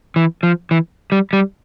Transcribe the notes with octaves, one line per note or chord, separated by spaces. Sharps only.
E3
F3
E3
G3
G3